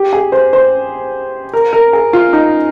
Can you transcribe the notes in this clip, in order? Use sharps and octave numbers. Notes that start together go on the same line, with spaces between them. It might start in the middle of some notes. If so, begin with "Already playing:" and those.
Already playing: G4
G#4
C5
C5
A#4
A#4
G#4
F4
D#4